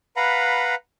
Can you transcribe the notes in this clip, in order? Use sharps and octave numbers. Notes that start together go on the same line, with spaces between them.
B4 F5 F#5 A#5 B5